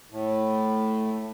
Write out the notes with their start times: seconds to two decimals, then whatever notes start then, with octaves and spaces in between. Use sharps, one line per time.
0.10 A2